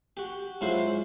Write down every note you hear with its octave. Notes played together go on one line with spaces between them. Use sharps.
F#4 G4
G#2 F#3 E4 F4 C5